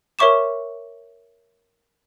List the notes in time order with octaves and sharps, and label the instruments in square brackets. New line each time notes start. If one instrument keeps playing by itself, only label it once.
[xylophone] A#4 C#5 E5 C#6 D6 E7